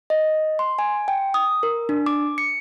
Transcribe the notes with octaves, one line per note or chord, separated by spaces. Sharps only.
D#5
C6
G#5
G5
D#6
A#4
D4
D6
C#7